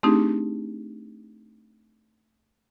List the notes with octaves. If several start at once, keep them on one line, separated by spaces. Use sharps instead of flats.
A3 C4 D4 D#4 G4 G#4